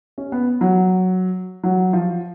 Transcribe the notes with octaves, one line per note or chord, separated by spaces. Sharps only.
C#4
B3
F#3
F#3
F3